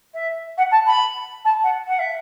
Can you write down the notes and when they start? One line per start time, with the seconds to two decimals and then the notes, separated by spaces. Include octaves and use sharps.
0.14 E5
0.58 F#5
0.71 A5
0.87 B5
1.45 A5
1.63 F#5
1.88 F#5
1.99 E5